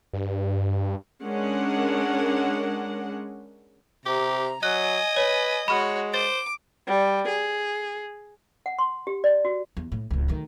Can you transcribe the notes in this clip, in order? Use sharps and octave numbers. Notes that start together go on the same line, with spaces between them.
G2
G#3 C#4 D4 A#4 F#5
C3 G4 A#5
F#3 D#5 G#5 F#6
B4 C#5
G#3 F#4 C#5 B5 C#6 F6
C5 D6 A6
G3
G#4
F#5
C6
G4
D5
F#4
E2
A2
D1 C#2
D2 D#3